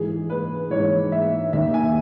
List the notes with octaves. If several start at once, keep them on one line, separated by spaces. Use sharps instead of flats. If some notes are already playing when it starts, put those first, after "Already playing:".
Already playing: G#2 E3 G#4
B4
G#2 E3 C#5
E5
D#2 D#3 E5
G#5